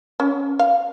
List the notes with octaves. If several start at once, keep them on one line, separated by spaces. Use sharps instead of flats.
C#4
F5